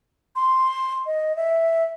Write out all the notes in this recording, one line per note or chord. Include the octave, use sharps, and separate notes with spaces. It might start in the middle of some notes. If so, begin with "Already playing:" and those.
C6
D#5
E5